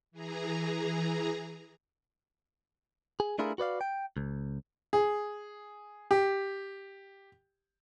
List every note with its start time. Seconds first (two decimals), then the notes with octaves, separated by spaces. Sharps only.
0.11 E3 G#4 A#5
3.20 G#4
3.38 A3 D4 E4 F4 G#4 A#4
3.58 F#4 B4 D5 F5
3.81 G5
4.17 C#2
4.93 G#4
6.11 G4